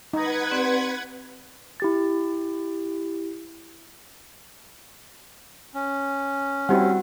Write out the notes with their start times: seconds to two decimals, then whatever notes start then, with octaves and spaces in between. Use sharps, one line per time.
0.13 D#4 B4 F#5 G#6
0.51 C4 G4 D5
1.80 E4 G4 A6
5.74 C#4
6.69 G3 C4 E4 F#4 G4 F#5